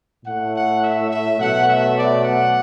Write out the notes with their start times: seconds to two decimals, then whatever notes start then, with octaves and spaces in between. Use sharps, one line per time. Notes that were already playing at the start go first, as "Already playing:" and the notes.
0.25 A2 A3 F#5
0.54 F#5
0.82 E5
1.10 E5
1.39 B2 F#3 A3 F#5
1.67 E5
1.96 D5
2.24 F#5